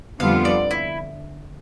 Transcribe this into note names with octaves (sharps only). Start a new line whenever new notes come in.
F2 D3 G3 B3 F4 F5
D5
E4